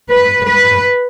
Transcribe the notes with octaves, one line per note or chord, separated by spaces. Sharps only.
B4
B4